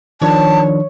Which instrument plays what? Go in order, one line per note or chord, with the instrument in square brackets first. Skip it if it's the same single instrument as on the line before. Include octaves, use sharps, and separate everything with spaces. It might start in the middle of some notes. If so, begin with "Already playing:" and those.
[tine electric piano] D#3 F3 D4 [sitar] C#5 [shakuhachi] A5